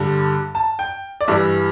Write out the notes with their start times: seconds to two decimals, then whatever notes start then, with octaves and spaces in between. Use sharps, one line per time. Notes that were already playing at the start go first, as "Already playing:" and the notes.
Already playing: G2 D3 G3 A5
0.55 A5
0.79 G5
1.21 D5
1.28 G2 E3 G3 E5